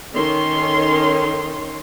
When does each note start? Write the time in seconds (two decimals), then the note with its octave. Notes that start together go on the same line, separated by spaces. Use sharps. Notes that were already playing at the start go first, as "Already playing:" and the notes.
0.13 D#3 C#4 A4 C#5 C6